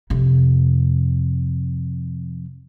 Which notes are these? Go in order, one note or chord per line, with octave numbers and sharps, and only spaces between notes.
F2 C3